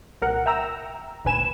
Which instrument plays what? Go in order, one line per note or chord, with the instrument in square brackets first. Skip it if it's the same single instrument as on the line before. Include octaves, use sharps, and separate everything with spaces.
[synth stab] C2 A#2 A#4 F#5
E5 G5 A#5 E6
G#1 D2 A#2 B4 G#5 E7